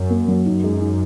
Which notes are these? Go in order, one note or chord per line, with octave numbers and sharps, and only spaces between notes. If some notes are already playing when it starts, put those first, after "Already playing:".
Already playing: F#2
A#3
F#3
F#2 D#4
G#3
D#4